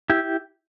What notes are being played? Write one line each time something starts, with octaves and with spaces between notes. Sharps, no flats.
E4 G4